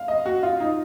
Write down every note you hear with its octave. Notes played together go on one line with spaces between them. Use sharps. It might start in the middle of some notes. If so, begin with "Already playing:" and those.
Already playing: F5
D#5
F#4
F4
D#4